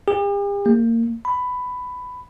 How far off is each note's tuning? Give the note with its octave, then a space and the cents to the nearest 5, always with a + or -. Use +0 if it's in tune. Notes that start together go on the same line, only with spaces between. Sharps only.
G4 +45
A#3 -25
B5 +10